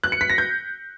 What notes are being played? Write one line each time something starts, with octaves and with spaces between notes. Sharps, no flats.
F#6
C#7
B6
A#6
G6